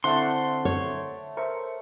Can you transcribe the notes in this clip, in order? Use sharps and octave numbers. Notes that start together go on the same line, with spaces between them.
D3 A3 C4 E4 C5 D5 F#5 C6
C#5
A#4 C5 E5 C#6